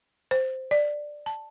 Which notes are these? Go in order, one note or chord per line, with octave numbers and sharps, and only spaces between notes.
C5
D5
A5